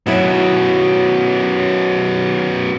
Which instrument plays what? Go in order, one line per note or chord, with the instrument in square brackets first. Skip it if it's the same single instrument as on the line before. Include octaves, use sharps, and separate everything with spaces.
[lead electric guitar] F#2 B2 [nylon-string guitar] F#3 E4